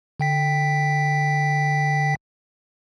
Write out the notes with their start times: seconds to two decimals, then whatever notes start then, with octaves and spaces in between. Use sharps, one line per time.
0.20 D3 G5 B6